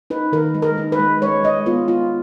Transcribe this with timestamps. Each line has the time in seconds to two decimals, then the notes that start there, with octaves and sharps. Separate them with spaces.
0.10 D#4 B4
0.32 D#3 A#4
0.55 G#3
0.62 A#4
0.78 D#4
0.92 B4
0.99 G#3
1.22 G#3 C#5
1.44 G#3 D#5
1.66 B3 F4
1.88 B3 F4